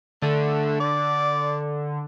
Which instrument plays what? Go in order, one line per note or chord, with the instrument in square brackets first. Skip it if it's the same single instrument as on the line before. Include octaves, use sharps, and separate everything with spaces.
[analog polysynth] D3 [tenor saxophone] A3
[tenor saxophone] D5